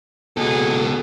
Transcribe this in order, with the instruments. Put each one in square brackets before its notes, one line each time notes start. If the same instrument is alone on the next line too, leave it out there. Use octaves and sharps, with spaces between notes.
[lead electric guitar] C#2 A4 [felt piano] B2 [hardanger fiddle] G#4